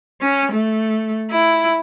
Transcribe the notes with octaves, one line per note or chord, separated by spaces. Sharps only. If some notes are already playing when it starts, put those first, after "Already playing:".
C#4
A3
E4